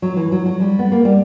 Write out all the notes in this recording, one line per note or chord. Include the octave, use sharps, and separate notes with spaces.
F#3
E3
F#3
F#3
G3
B3
A#3
G3